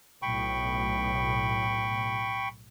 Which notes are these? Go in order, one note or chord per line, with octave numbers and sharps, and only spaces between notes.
B1 A2 G5 B5 C#6